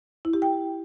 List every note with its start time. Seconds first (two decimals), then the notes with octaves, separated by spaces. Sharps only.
0.25 E4
0.33 G4
0.42 G5